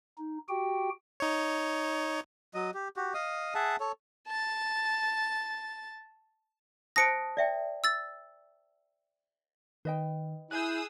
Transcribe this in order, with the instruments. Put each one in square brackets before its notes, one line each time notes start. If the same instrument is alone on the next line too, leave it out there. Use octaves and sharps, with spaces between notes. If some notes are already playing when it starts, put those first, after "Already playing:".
[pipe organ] D#4
F#4 G4 G5
[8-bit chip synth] D#4 C#5
[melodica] F#3 D#5
G4
F#4 G4
D#5 F5 D#6
G#4 E5 F#5 A5
A4 C#5
[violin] A5 A6
[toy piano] C5 A5 D#6 [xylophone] A#6 C#7 D7
[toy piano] D5 E5 G5
[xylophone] E6 A6
[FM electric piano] D#3 [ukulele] B4 D#5 G5
[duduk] E4 [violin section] G#4 D#6 E6 [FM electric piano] F#6 G6